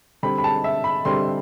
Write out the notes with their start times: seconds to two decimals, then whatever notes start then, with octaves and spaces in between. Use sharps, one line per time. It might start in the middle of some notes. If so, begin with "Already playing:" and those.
0.23 D3 G3 C4 B5
0.38 B5
0.44 A5
0.64 E5
0.84 B5
1.05 D3 G3 C4 C6